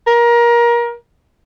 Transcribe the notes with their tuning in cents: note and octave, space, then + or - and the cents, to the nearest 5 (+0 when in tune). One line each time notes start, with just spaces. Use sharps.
A#4 +25